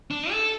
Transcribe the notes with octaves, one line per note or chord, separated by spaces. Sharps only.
D4
A4